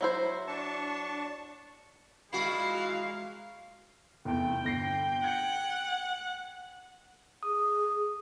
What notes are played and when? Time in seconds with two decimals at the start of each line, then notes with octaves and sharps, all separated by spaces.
0.01 F#3 E4 C5
0.47 D4 A5 C#6
2.33 A#2 G#3 E4 F#4 F5 C7
4.25 F1 E2 G5
4.64 G1 A#6 C7
5.24 F#5 G#6 C#7
7.43 G#4 D#6